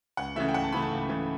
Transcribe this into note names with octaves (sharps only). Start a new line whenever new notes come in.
C#2 F#5
C#3 E3 A3 E5
G5
C#2 F#5
A5
C#3 E3 A3 B5
A5
C#2
C#3 E3 A3